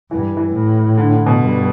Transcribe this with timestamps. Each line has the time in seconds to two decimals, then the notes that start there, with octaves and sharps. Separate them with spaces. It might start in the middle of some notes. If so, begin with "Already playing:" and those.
0.11 G2 E3
0.37 E3
0.54 A2
0.97 D3
1.12 D3
1.26 B2
1.41 G2